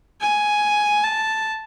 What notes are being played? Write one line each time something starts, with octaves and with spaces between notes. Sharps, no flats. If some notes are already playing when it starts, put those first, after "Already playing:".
G#5
A5